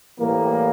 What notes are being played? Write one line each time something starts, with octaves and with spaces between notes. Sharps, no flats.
A2 E3 G3 A#3